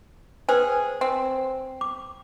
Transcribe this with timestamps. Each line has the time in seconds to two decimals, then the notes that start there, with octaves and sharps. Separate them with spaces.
0.49 G#4 B4 C5 G5
1.01 C4
1.81 D6